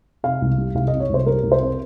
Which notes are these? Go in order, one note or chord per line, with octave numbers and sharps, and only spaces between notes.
C3 F5
C2
G3
C2 F5
C3 D#5
C#5
C2 C5
G3 A#4
C2
C5
C3